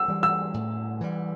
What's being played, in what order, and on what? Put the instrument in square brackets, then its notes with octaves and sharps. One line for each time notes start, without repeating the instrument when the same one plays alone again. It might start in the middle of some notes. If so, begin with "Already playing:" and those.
Already playing: [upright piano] E6
[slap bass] E3 G3
[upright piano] E6
[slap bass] A2
E3 G3